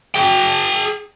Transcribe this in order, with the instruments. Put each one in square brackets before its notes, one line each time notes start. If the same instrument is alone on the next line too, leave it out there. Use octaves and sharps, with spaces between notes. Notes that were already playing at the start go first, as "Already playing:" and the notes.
[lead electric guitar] G#4 G5